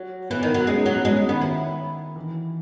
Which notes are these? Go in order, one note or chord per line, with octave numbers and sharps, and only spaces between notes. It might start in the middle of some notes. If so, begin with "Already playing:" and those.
Already playing: F#3
E3 B3
D#3
F#3
G#3 C#4
D#4
F#3 C#4
B3
G#3 C#4
C#4
D#3 B3
E4
E3